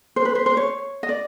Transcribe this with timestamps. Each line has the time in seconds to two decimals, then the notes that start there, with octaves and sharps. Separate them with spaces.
0.16 C5
0.25 B4
0.35 C5
0.46 C5
0.57 C#5
1.03 D#5
1.09 D5